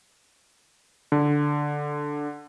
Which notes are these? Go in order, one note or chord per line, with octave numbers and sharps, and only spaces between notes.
D3